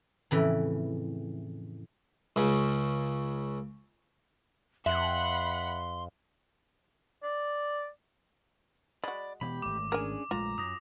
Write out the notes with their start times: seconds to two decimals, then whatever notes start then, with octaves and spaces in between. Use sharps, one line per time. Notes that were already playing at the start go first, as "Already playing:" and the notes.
0.31 F2 A2 C#3 E3
2.36 C#2 C#3
4.86 F2 E5 F#5 B5 C6 F#6
7.23 D5
9.04 G#3 F#4 D5 B5
9.41 B2 E3 B3 G4 B5
9.62 G#1 A3 D6
9.92 C#4 D4 G#4 A#4 G#5
10.31 A#1 G#3 A3 F4 A#5
10.58 F#2 D#6 A#6